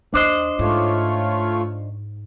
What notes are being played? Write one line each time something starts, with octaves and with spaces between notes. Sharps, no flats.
D#2 D4 C5 D#5
G#2 A3 F4 C#5